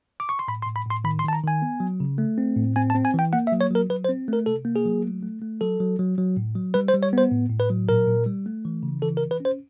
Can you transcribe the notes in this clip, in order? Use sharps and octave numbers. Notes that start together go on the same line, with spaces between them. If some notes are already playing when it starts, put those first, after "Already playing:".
D6
C#6
C6
A2 B5
C6
A2
B5
A2 C6
D#3 B5
C6
D#3 A5
A#5
D#3 G#5
B3
F#3
C#3
A3
C4
A2
C4 G#5
A5
C4
G#5
E3 G5
A#3 F#5
E5
F#3
C#5
F#3 A#4
F#3 B4
C5
C4
A3 A#4
C3 A4
A#3
G#4
F#3
A3
A3
A3
F#3 A4
F#3
F#3
F#3
A2
F#3
G3 B4
C5
G3
C#5
B3 C5
A2
A2
B4
F#3
A#2 A#4
A#2
G3
A3
E3
C#3
E3 A4
A#4
E3
B4
C#4
C5